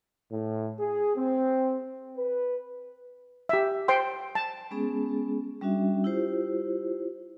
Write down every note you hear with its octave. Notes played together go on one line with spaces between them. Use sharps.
A2
G#4
C4
B4
G4 E5
C5 G5 C6
A5
G#3 B3 C#4 G#4
G3 C#4 D4 F#4 E5
E4 F4 G4 C5